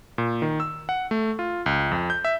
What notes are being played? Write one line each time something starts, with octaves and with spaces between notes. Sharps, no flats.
A#2
D#3
E6
F#5
A3
F4
C#2
F2
G6
E5